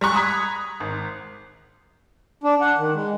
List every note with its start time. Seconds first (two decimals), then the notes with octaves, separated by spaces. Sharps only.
0.01 G3 A#5 C#6 F#6
0.14 A#5 B5 D#6 G#6 B6
0.80 G#1
2.44 D4
2.61 F#5
2.77 D#3
2.94 G#3